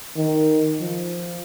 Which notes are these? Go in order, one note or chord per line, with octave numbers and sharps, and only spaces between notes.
D#3
F3